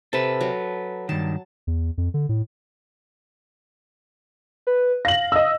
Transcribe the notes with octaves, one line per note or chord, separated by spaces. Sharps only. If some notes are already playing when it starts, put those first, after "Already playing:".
C3 A4 B4 A5
F#3
G2 D#3 A5
E2
F2
D3
A2
B4
F5 A#6 F#7
D#5 E6